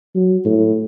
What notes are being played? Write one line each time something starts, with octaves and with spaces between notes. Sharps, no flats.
F#3
A2